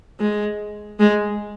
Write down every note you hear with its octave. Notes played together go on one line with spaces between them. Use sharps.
G#3
G#3